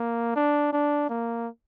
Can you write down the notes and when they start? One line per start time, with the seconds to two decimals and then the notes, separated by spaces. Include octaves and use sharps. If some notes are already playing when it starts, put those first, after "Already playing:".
Already playing: A#3
0.36 D4
0.73 D4
1.09 A#3